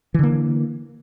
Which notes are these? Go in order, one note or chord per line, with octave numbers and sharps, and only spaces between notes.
D3 E3 A#3